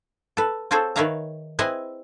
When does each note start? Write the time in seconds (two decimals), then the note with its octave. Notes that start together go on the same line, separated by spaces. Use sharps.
0.37 A4 B4
0.71 C4 F4 G#4 A4 C5 C#5
0.96 D#3 B4 C#5 E5 F5 A#5
1.59 C4 E4 G#4 B4 D#5 G#5